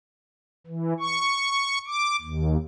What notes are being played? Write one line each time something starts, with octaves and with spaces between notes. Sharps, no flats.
E3
C#6
D6
D#2